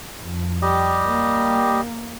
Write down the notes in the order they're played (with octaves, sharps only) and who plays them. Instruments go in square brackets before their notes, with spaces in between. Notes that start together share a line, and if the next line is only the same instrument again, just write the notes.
[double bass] F2
[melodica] G3 G4 D#5
[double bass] A#3